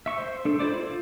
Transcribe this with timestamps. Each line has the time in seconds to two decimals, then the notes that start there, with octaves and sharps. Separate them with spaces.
0.06 E5 C#6
0.18 C5
0.45 D4 A4
0.59 E4 F4 C5 D5 D6
0.81 F4